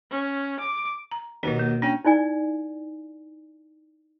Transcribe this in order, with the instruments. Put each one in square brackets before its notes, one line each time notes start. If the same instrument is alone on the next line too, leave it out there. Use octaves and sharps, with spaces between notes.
[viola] C#4
D6
[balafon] A#5
[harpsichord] D#2 B2 [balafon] D#4 F#4
[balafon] A#3
[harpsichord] C#4 G5 [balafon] D4
[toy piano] D#4 E4 D5 G#5